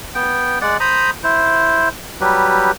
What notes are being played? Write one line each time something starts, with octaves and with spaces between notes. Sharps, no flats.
B3 G5
G#3 D5 F#5
C5 A#5 B5 D#6
E4 C5
F#3 G3 G4 B4